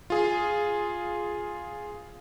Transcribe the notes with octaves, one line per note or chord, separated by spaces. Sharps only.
F4 G#4